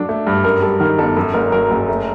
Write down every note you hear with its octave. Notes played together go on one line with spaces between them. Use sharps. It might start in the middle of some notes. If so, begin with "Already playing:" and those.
Already playing: F#3 D4 A4
A3
G2
F#2 A#4
G3 A4
D#3 A#4
G1 A4
F#2 A4
F#1 A#4
F#3 A#4
F#1
A3